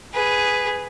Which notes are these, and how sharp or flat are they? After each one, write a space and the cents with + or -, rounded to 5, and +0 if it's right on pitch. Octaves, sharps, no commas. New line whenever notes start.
G#4 +0 B4 +5